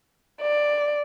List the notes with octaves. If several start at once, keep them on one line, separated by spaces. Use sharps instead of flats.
D5